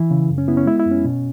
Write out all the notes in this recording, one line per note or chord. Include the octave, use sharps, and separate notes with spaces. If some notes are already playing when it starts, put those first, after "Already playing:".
Already playing: E3 E4
C#3
F#2
C#4
B3 E4
C#4
G#3 E4
E4
F#2
C#4
B2